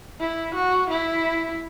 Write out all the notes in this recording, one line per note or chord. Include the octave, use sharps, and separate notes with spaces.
E4
F#4
E4